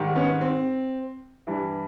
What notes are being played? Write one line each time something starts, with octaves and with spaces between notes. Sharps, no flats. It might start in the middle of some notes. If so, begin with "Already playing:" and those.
Already playing: G#2 D#3 G3
B3 C#4
C4
G2 E3 G3